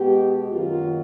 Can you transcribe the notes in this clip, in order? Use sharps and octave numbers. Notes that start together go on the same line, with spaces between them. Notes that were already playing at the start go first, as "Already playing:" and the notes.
Already playing: B2 G#3 B3 G4
F#2 D#3 F#3 A#3 F4